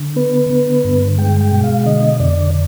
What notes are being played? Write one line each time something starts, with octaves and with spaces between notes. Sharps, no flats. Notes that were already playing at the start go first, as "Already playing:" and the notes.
Already playing: D3
B3 B4
D3
G2
G#3 G5
G5
B2
F5
D3 D#5
F2 D5